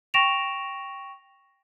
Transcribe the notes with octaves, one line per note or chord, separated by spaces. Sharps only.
G5 C#6 A#6 D7 E7 F7